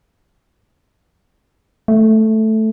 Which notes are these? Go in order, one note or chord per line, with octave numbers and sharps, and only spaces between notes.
A3